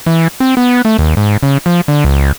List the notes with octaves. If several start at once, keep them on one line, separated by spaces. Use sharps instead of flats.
E3
C4
B3
A3
D#2
G#2
C#3
F3
D3
C#2